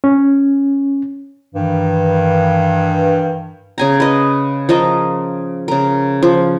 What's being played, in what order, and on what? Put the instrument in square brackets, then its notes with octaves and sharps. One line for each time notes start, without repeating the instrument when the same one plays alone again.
[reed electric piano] C#4
[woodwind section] G2 D#3 E3
[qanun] C#3 G#5 A#5
B4 D#5
F3 A#4 D#5 A5
C#3 A#4
F3